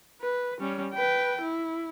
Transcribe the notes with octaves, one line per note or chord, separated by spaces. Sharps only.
B4
G3 C#4
B4 G5
E4